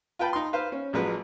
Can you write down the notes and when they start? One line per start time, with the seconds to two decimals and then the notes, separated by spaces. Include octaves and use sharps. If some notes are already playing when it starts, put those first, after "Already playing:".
0.19 F4 B4 G5 A5 B5
0.33 D#4 C6
0.53 B4 C5 F5
0.72 C#4
0.93 A1 F3 F#3 G#3 B4